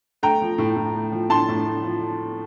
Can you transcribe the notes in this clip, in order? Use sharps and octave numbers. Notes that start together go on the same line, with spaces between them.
A3 G5 A#5
F3
A2
A2
A3
F3
A2 A5 C6
A2
A3
F3